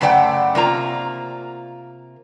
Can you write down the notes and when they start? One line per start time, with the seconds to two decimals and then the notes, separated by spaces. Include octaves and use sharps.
0.01 F#2 C#3 A3 D5 F#5 G5
0.55 C3 A#3 F4 A#5